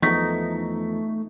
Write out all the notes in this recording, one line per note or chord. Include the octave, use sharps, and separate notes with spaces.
E2 F3 A3 B3 D#4 C#6 B6